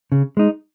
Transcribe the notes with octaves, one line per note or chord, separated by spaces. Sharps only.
C#3
G#3 D#4